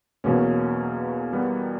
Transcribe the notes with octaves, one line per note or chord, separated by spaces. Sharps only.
E2 B2 F#3 A#3 C#4
G3 B3